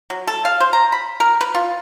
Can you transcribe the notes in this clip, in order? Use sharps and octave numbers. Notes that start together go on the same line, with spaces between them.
F#3
A4
F5
C5
A#5
B5
A#4
B4
F4